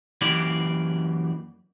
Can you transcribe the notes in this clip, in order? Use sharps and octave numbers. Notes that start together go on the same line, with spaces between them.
F#2 E3 A#3 G4 D5